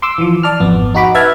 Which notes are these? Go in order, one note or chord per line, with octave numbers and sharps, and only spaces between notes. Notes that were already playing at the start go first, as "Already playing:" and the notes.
C6 D6 E6
E3 F3
D5 A5 F6
G#1 F2 B3
D#4 F#4 B5 D6
B4 E5 A5 F6 G#6